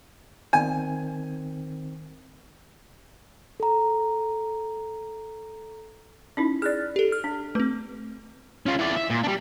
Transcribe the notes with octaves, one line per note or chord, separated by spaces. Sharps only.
D#3 C4 G#5
A4 A#5
C#4 D#4 E4
G#4 D5 F6 F#6 A6
G4 A4
F6
D4
A3 C4 B4
C#4 F4
E3 D5
E5
A#2
G3 D4